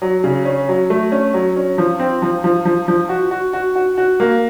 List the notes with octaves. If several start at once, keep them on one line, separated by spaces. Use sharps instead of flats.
F#3
C#3
C#4
F#3
A3
C#4
F#3
C#4
F3
C4
F3
F3
F3
F3
F#4
F#4
F#4
F#4
F#4
A#3